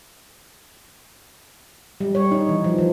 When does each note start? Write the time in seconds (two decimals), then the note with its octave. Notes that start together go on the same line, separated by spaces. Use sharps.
2.01 G3
2.15 C#5
2.31 D#4
2.49 E3
2.64 F3
2.78 E3